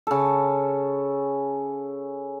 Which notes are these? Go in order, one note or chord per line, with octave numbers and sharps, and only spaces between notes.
C#3 A4